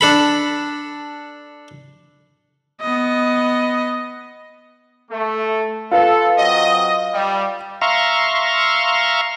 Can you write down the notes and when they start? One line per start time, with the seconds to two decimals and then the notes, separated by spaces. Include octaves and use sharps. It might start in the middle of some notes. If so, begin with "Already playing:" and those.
0.01 D4 A4 B5
2.81 B3 D#5
5.11 A3
5.91 F4 A4 B4 F5
6.38 F#3 C4 D#5
7.14 G3
7.82 E5 F5 A#5 C6 C#6